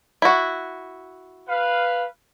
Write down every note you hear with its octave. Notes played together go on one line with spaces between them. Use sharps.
E4 F#4
B4 F5